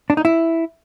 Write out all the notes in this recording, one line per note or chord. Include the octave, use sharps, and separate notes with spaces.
D4
D#4
E4